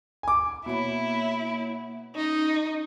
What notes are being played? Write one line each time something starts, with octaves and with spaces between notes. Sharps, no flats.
G#5 D6
B2 A#3 E4 C#5 B5
C#4 D#4